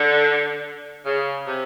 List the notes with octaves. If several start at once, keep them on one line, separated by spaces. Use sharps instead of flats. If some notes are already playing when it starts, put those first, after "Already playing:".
Already playing: D3
C#3
C3